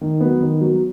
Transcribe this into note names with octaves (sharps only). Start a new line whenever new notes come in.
D#3
F#3 B3
D#3
F#3 B3